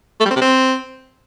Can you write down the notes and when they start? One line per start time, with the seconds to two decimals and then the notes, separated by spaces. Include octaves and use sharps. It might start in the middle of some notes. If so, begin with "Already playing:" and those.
0.20 A3
0.25 G3
0.31 C4
0.36 C3
0.41 C4